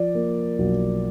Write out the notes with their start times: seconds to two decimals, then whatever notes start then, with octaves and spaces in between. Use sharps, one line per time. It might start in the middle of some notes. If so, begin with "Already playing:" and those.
Already playing: F3 D5
0.15 A#3
0.58 B1